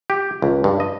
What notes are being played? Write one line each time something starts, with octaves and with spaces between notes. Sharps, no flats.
G4
C#2
G2
D#5